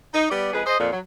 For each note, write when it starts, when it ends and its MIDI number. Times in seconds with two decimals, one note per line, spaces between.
0.14 0.27 63
0.30 0.50 55
0.30 0.50 59
0.30 0.50 74
0.53 0.62 41
0.53 0.62 56
0.53 0.62 68
0.53 0.62 71
0.65 0.79 68
0.65 0.79 72
0.65 0.79 75
0.79 0.88 41
0.79 0.88 46
0.92 0.99 54